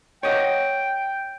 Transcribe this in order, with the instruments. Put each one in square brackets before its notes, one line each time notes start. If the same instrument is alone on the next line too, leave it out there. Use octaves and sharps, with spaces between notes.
[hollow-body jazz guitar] C#5 D#5 F#5 [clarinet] G5